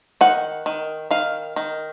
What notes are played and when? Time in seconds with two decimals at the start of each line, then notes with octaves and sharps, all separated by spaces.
0.21 D#3 F#5
0.66 D#3
1.11 D#3 F5
1.56 D#3